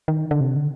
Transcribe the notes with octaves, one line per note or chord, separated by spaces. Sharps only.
D#3
D3
C3
D3